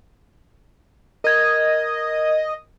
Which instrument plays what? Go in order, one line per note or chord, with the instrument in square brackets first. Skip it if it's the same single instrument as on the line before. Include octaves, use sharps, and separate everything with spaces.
[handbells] A#4 G#6 [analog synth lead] D#5